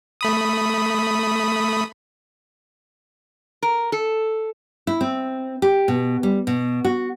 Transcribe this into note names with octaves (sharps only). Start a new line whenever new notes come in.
A3 B5 D#6
A#4
A4
E4
C4
G4
B2
G3
B2
F#4